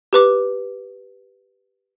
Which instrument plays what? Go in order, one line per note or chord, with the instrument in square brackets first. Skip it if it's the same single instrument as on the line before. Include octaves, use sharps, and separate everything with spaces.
[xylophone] G4 B4 D6